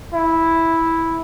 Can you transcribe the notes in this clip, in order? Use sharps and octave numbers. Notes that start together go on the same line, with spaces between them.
E4